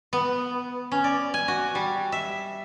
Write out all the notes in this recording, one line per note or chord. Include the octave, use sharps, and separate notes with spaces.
B3
C#4
D5
G#5
F#4
G3
E5